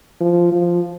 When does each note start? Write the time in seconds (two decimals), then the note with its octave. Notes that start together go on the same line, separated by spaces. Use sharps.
0.21 F3
0.52 F3